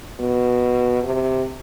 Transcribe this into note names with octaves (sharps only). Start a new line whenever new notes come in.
B2
C3